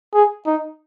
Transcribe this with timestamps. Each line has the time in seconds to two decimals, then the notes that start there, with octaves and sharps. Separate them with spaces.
0.14 G#4
0.47 D#4